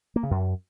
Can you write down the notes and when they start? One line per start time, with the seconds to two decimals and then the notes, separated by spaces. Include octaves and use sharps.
0.16 A#3
0.23 C#3
0.31 F#2